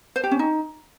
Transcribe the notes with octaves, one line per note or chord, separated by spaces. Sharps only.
C5
G4
C#4
D#4